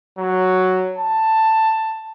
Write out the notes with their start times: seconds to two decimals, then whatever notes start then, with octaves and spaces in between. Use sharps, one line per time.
0.18 F#3
0.98 A5